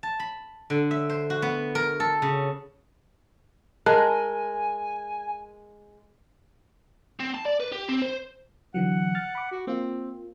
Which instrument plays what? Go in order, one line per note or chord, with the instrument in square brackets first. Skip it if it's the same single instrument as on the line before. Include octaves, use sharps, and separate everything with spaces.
[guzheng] A5
B5
D3
E5
C5
F#4
B3
A#4
A4
C#3
[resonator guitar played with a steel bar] G#3 [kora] A#4 [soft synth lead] G#5 [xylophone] A5 F#6
[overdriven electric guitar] C4
A5
D5
B4
G4
C4
C5
[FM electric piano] D3 E3 F#3 [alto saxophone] F#5
[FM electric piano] F6 A6
B5 D6
[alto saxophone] F#4
[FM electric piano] A#3 F4 [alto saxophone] C4